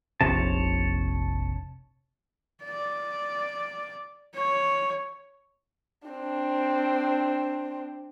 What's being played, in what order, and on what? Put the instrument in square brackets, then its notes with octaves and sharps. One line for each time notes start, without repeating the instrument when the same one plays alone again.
[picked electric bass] F1 A#1 C3 [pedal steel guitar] C#5 A5
[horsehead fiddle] D5
C#5
[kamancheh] C4 D4